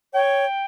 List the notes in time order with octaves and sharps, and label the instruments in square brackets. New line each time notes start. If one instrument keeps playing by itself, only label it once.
[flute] C#5 [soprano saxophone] G5